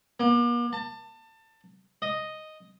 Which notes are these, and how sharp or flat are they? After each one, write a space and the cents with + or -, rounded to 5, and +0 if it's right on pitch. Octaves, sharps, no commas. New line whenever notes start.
A#3 +45
A5 +25
D#5 +0